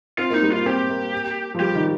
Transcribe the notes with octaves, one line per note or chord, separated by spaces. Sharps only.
C4 F4
A#3 D#4
G3
A#3 F4
C4 G4
A#3
F3
G3 G4
D#3